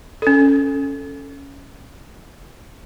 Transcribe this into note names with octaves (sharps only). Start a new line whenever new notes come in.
C#4 A4